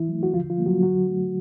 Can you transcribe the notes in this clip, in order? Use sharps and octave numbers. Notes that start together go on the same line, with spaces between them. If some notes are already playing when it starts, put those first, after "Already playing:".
Already playing: E3 E4
F#3 A3
F#4
D3 F3 F4
F3 F4
G3 A#3
F#3 F#4
D3 F#3 F#4
F#3 A3